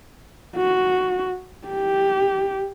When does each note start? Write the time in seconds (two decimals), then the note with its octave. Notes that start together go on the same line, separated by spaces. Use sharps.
0.56 F#4
1.67 G4